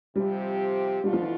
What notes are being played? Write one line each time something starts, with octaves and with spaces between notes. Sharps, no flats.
C3 F3 G3 C4 G4
B2 G3 A3 D4 F4
F3
E3